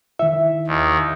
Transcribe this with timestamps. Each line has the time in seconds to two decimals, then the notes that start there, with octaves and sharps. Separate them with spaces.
0.19 D#3 E4 E5
0.67 D#2